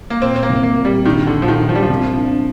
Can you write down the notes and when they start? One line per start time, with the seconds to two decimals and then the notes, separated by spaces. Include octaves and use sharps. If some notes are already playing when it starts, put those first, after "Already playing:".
0.10 A#3
0.22 A#2 C4
0.36 C4
0.43 A#3
0.49 C2
0.63 A#3
0.77 A#2
0.85 G3
1.05 A#1 D#3
1.27 D3
1.34 A#1
1.42 F3
1.48 D#3
1.61 A#1
1.69 F3
1.75 G3
1.83 F3
1.89 C2
2.17 D4